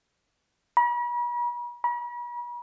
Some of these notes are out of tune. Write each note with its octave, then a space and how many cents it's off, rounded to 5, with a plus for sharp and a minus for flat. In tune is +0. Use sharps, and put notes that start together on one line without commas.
B5 -45
B5 -45